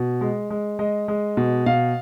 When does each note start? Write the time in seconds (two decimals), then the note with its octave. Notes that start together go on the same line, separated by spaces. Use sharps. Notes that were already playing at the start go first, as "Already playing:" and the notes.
Already playing: B2
0.21 G#3
0.50 G#3
0.79 G#3 D#5
1.08 G#3
1.37 B2
1.66 B2 F5